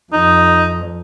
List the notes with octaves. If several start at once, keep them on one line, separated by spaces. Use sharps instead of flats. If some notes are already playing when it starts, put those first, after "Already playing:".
F2 D#4